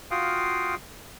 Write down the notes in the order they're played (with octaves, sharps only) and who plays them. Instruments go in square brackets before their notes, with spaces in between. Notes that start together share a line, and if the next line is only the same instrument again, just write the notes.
[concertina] F4 F#4 F5 G5 D#6